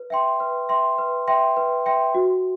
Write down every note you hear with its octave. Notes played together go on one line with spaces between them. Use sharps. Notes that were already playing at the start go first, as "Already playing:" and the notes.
Already playing: B4
E5 G5 C6
B4
E5 G5 C6
B4
E5 G5 C6
B4
E5 G5 C6
F#4